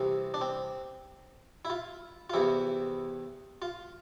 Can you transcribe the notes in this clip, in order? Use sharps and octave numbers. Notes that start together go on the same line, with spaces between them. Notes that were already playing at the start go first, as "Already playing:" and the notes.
Already playing: C2 C3 E3
D4
C4
E4
F4
F4
E2 C3 E3 E4
F4